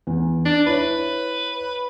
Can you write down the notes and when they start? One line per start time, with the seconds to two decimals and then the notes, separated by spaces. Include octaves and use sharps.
0.07 E2
0.46 D4
0.67 E4 B4 C#5